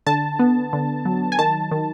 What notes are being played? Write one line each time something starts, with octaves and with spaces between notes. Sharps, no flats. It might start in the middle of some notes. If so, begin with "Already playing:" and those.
D3 A5
B3
D3
F#3
G#5
D#3 A5
D#3